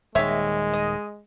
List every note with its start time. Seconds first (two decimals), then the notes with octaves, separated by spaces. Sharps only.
0.15 D#1 C3 D#3 G#3 C#5 E5
0.73 D#5